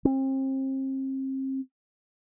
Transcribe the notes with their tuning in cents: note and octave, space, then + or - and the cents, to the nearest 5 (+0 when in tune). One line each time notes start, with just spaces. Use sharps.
C4 +35